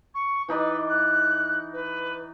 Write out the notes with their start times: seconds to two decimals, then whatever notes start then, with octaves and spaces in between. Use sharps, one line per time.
0.15 C#6
0.48 E3 D#4 B4 D5
0.89 F#6
1.73 B4